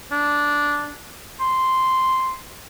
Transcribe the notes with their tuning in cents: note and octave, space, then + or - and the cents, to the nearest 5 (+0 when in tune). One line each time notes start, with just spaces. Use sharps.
D4 -10
C6 -5